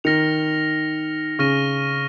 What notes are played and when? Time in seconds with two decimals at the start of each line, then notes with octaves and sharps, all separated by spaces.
0.04 D#3 F6 A#6 C#7 F7
1.39 C#3 C#6 F6 A#6 D#7